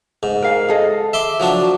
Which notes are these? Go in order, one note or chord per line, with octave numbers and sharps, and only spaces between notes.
G#2
A#4 F5 G#5
G#4 A4 D#5
E5 C6 D6
F3 F#3 D4